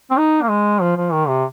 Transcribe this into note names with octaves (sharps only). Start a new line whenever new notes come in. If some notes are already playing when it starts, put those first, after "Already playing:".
C4
D#4
A#3
G#3
F3
F3
D#3
C3